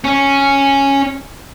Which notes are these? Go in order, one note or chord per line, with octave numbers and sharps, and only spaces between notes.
C#4